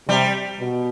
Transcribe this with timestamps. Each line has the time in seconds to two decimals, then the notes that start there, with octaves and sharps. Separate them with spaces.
0.08 C3 G3
0.60 B2